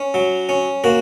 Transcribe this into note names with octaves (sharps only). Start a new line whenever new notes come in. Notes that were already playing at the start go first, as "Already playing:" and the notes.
Already playing: C#4
F#3
C#4
A#3 F#4